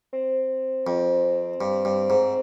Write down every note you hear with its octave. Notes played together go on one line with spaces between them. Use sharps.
C4
F2
G2
G2
G#2